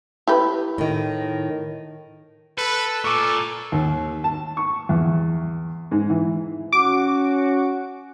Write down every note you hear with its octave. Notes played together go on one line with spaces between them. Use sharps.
E4 G4 B4
A2 D#3
A4 B4
A#2 A4 C#6 D6
D#2
A5
C#6
E2
G#2
E3
C#4 F#4 D6